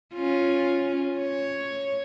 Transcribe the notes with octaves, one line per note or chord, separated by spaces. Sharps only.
C#4 F4
C#5